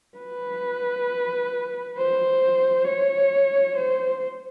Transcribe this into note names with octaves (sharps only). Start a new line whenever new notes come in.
B4
C5
C#5
C5